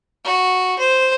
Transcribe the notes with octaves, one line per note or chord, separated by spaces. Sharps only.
F#4
C5